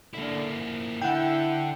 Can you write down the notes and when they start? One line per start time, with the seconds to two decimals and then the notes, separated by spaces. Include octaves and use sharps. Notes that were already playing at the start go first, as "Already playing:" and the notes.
0.14 D3 A#3 E4
0.54 F3
1.02 D3 E4 F#5 G5